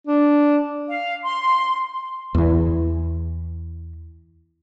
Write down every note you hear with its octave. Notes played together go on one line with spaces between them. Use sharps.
D4
F5
C6
E2 E3